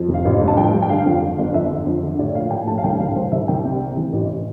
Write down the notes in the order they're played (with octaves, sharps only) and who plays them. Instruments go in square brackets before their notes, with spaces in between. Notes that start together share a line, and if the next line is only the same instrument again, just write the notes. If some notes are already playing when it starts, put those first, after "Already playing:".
Already playing: [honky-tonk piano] F2
F1
F5
A1
G2
A5
F3 G5
G2
G5
D3 F5
F2
D3
G1
F2 E5
D3
F2
D3
A2 D5
A#1 F5
F3 G5
A2 A5
F5
C2 G5
C2 F5
C2 C5
C2 E5
C2 G5
C3
C3
E3
A1